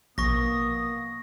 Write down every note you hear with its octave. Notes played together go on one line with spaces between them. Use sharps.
A#1 B2 A#3 C#6 D#6 A#6